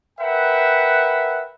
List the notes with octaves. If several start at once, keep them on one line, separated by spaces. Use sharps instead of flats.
A#4 B4 E5 F#5 G5